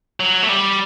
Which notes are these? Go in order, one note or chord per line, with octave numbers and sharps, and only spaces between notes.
F#3
A3
G3